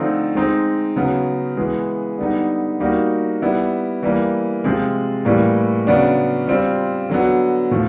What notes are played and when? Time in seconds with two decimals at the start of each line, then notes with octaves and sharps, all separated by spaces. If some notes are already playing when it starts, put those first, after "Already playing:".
Already playing: D3 F3 A3 C4 D#4
0.35 G#3 C4 D#4
0.96 C#3 F#3 B3
1.57 E3 G#3 B3
2.18 D3 G3 B3 D#4
2.80 G3 A#3 D#4 F#4
3.42 G3 B3 E4
4.03 E3 G3 A#3
4.64 C3 F3 G#3
5.25 A2 E3 G3 A#3
5.87 C#3 F#3 B3 D4
6.48 G3 C4 F4
7.09 D3 F#3 B3
7.71 A2 F3